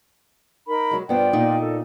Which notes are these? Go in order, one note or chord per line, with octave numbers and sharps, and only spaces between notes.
D#4 A#4 B5
F#3 G#3
G2 B3 F4 C5 D5 G5
A#2 D#4 D#5
A4